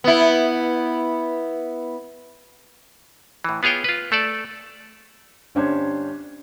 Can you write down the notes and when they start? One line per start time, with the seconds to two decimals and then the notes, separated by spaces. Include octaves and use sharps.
0.04 B3 E4
3.44 A2 E3
3.63 B3 F4 G#4 C#5 G5
3.84 F4 B4
4.12 A3 A4 D5
5.55 G1 G3 C#4 D4 C5 G#6